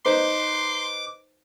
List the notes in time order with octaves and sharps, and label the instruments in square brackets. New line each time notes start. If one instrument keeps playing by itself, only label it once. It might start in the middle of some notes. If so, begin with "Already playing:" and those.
[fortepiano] D#4 B4 C5 [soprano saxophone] C6 [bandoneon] D6